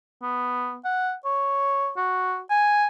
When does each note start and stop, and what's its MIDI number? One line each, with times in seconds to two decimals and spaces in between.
0.23 0.78 59
0.85 1.14 78
1.25 1.92 73
1.97 2.40 66
2.50 2.87 80